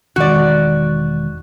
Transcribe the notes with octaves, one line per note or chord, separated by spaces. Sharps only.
E1 D#3 G#3 F#4 D5